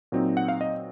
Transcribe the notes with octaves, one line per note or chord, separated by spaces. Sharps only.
A#2 F#3 C4 D#4
F#5
F5
D#5